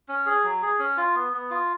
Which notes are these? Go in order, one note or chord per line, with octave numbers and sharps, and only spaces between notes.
C#4
G#4
F#3
G#4
C#4
F4
B3
B3
F4